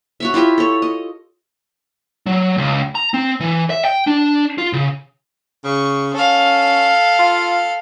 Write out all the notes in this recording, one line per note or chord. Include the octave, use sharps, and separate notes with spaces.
F#4 C#5 E5
E4 F4 G4 E5
A4 C#5
D#5
F#3
C#2
A#5
C4
E3
E5
G5
D4
F4
C#3
C#3 C#6
C#4 A4 F5
F4